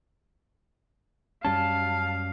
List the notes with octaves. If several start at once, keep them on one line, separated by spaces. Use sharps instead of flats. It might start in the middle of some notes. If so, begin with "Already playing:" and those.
F#2 G3 C#4 F5 A5